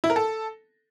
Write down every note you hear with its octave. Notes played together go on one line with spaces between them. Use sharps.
E4
A#4
A4